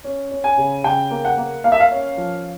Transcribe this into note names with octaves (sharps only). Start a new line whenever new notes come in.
C#4
C#4
G#5
C#3
C#3 G5
A#3
F#5
A#3
A#3 F5
E5
F5
C#4
F3